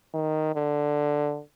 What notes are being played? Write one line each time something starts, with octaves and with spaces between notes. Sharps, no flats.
D#3
D3